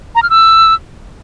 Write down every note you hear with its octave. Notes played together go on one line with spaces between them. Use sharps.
A#5
F6
E6